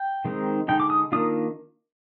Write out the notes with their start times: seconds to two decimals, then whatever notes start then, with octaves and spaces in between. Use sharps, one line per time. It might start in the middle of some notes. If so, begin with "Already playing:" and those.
Already playing: G5
0.25 D#3 G#3 C4 D#4
0.68 D3 G#3 D#4 G5
0.80 D6
0.90 D#6
1.12 D#3 A#3 D4 F4 D#6